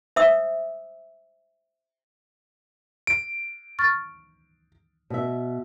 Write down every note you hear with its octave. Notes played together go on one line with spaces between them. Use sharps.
C5 E5 D#6 E6
D7
C#6 F6 A6
B2 E5